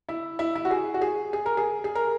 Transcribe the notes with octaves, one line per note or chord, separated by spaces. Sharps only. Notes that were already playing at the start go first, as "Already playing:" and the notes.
E4
E4
E4
F#4
G#4
F#4
G#4
G#4
A#4
G#4
G#4
A#4